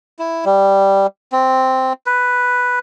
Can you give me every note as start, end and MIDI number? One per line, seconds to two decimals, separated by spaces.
0.19 0.45 64
0.45 1.07 55
1.32 1.93 60
2.06 2.79 71